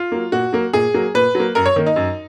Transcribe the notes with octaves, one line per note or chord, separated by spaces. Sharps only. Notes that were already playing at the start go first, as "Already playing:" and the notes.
Already playing: F4
F#3 A#3
A#2 F#4
F#3 A#3
A#2 G#4
F#3 A#3
A#2 B4
F#3 A#3
F#2 A#4
C#5
D#3 A#3
D#4
F#2